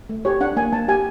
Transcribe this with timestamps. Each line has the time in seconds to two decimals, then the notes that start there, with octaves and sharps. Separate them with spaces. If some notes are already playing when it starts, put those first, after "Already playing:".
0.09 A3
0.25 G4 C#5
0.41 D4 F#5
0.57 A#3 G#5
0.72 A#3 A5
0.88 G4 G#5